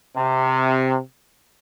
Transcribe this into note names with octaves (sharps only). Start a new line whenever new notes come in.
C3